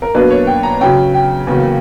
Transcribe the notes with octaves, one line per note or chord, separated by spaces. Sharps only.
A#4
B2 F#3 A#3 D4 B4
C#5
G5
A#5
C#3 F#3 C#4 G5
G5
E2 C#3 F#3 A#3